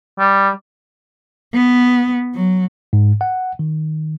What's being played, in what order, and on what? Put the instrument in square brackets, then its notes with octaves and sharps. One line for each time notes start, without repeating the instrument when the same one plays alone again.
[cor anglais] G3
[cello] B3
F#3
[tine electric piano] G#2
F#5
D#3